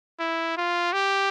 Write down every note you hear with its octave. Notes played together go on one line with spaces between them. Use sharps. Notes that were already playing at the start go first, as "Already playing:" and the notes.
E4
F4
G4